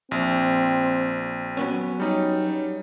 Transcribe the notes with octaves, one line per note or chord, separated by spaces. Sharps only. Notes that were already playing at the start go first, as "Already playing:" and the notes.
A#1 C4
F#3 B3 C#4
G3 D#4 C#5